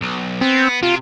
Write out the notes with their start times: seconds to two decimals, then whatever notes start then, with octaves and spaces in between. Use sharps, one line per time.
0.01 B1
0.41 B3 C4
0.83 C3 F4